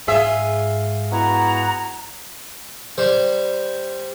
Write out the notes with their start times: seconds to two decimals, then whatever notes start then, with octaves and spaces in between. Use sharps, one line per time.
0.07 G#2 F4 G#4 E5
1.12 B3 E4 F#4 A#5
2.98 G3 C5